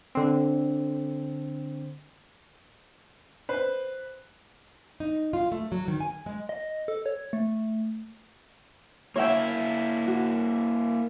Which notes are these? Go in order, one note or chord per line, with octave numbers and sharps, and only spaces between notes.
D3 C4
B4 C5
D#4
F4
A3
F#3
D#3
G#5
G#3
D#5
A4
C#5
A3
A#3 E4 C#5 E5 G5
F#4